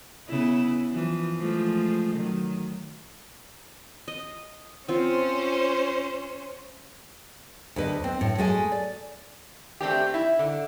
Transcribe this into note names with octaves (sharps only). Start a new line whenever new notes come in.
C#3 B3 E4
E3 F3
F3 G#3 A3
D#3 F#3
D#5
C4 C#4 F4 C5
D2 B4 D#5
C4
A2
G#3 A3 G#5
D5
A3 C4 D4 G4
E4
D3